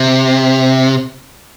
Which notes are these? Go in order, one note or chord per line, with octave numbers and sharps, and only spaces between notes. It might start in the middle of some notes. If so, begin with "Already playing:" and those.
Already playing: C3